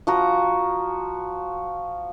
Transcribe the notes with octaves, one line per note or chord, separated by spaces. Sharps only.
F3 F#4 A#5